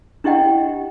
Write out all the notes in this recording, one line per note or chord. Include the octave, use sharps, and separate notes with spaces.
D4 E4 G4 D#5 F#5 G5